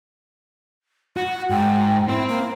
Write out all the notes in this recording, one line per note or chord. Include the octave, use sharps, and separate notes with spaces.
F#4 F#5
G#2 G5
C4 E4 C5
A#3